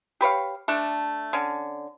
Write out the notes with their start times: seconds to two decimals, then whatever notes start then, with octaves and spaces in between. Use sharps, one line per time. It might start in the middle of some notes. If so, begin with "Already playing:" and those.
0.21 G4 B4 C#5 F5
0.68 A3 D4 A4
1.33 D3 C#4